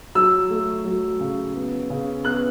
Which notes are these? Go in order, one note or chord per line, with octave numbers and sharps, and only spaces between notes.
F#3 E6
A3
F#3
C#3
B3
C#3
B3 F#6